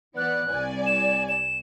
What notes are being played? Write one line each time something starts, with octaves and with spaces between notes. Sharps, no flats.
E3 B3 D5 F#6
C2 D5 G#5
E7
E7